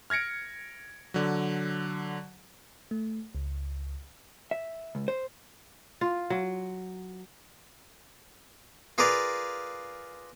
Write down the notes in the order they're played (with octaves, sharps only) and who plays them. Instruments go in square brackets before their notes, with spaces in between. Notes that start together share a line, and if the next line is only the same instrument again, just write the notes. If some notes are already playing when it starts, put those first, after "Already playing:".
[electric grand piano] F6 G#6 A#6 C#7 D7
D3 F#3
[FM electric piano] A3
C#2
[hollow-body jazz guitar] E5
C#2
C5
[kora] F4
F#3
[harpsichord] F4 G#4 A#4 B4 D5 F5